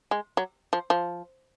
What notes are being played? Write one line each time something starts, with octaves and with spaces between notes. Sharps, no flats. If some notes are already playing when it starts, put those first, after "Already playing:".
G#3
F#3
F3
F3